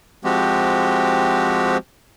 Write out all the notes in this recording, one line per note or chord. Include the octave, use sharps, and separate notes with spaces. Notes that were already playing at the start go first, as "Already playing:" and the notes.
F3 G#3 C4 F#4 G4